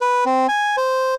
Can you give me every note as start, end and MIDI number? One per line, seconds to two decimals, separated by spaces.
0.01 0.24 71
0.26 0.47 60
0.48 0.76 80
0.77 1.15 72